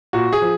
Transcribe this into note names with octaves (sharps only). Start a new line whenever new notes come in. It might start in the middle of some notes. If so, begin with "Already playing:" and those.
A#2 F#4
G#4
F3